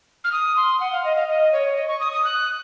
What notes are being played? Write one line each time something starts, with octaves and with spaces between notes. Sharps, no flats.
F6
D#6
C6
F#5
F5
D#5
F5
D#5
C#5
D#5
C#6
D#6
D#6
F#6